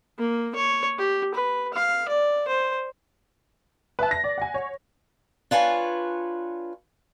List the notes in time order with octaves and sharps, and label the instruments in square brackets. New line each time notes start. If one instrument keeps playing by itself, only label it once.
[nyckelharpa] A#3
C#5
G4
B4
F5
D5
C5
[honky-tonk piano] B4 E5 A5
A#6
D5
F#5 G#5
C#5
[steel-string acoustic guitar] D4 F4 B4 C#5 G#5